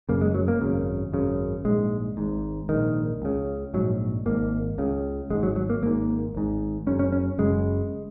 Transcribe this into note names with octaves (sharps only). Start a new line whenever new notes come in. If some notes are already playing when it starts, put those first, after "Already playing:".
F#1 F#2 C#3 A#3
G#3
F#3
A#3
G#1 F#2 C#3
G#1 F#2 C#3
A#1 G#2 G#3
G#1 G#2
A#1 G#2 D#3
C#2 C#3
A#1 G#2 F#3
G#1 G#2 A#3
C#2 C#3
G#1 G#2 G#3
F#3
F#3
A#3
G#1 G#2 A#3
G#1 G#2
F#1 F#2 C#3 C#4
C#4
C#4
F#1 F#2 C#3 G#3